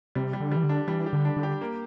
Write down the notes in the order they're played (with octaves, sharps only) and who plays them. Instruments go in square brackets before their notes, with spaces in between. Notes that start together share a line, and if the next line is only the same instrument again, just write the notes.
[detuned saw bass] C3 [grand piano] G3
[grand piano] G3
[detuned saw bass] D3
[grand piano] G3
[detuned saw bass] E3
D3
[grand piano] D4
[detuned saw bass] E3 [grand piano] G3
[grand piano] G4
[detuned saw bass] D3
[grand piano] D4
[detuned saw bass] D3
[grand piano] G4
A#3